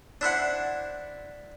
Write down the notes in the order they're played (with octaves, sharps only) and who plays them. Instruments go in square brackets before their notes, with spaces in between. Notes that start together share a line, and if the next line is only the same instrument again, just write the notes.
[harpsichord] D4 E4 C5 F#5